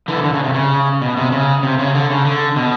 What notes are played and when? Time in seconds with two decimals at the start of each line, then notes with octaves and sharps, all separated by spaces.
0.08 D3 E3
0.24 D3
0.34 C#3
0.44 C3
0.54 C#3
1.02 B2
1.17 C3
1.32 C#3
1.63 C3
1.79 C#3
1.95 D3
2.10 C#3
2.25 D3
2.56 B2